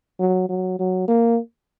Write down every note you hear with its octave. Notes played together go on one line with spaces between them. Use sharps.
F#3
F#3
F#3
A#3